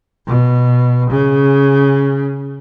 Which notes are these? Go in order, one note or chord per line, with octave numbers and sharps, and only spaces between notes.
B2
C#3